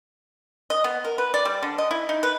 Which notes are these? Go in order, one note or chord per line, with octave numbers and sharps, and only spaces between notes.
D#5
B3
A#4
B4
D5
G3
D3
D#5
E4
D#4
B4